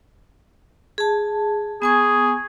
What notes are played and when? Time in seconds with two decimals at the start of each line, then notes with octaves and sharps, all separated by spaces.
0.98 G#4 A5
1.82 B3 G#4 G#5 C#6